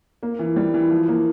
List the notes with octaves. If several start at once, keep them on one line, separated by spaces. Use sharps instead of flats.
A#3
E3
G3
E3
F3
A#3